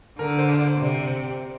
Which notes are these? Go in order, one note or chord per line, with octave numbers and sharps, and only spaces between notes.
D3 A#4
C5
C5
D5
C3 D5